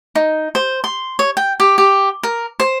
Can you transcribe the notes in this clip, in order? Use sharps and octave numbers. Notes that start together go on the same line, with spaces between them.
D#4
C5
C6
C#5
G5
G4
G4
A#4
C5